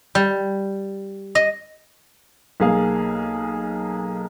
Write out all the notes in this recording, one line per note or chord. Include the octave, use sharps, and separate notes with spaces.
G3
D#5
B1 A#3 G#4 F5